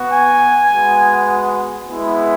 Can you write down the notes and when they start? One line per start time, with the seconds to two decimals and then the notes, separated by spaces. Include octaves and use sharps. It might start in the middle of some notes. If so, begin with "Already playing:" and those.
Already playing: B3 F#4
0.13 G#5
0.71 G#3 B3 F#4
1.88 G#3 B3 E4